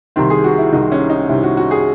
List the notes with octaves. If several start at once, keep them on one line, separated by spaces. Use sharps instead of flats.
C2 C3 D#3 C4
G#4
F#4
E4
C2 C3 D#3 D#4
C#4
D#4
C2 C3 D#3 E4
F#4
F#4
G#4